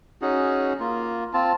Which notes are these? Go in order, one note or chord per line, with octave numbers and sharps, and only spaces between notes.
C#4 D#4 F#4 G#4
A#3 F4
C4 F4 A5